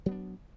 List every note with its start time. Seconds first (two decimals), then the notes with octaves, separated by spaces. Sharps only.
0.06 F#3
0.09 B3
0.11 D4